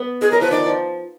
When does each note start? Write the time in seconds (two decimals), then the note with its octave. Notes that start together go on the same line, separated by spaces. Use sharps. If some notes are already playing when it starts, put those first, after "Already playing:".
Already playing: B3
0.21 G#3 G#4
0.31 F#3 A#4
0.41 F3 B4
0.51 D#3 D5
0.66 F3